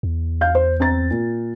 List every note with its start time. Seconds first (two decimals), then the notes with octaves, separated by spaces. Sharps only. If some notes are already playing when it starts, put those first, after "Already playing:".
0.03 E2
0.41 F5 G6
0.55 C5
0.80 C4 A#5 A6
1.11 A#2